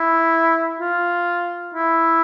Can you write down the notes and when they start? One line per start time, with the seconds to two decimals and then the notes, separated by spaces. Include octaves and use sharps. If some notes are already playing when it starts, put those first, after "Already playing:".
Already playing: E4
0.81 F4
1.74 E4